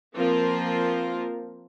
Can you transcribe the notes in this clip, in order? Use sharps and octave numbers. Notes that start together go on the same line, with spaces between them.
F3 A#3 C4 F4 A#4 C5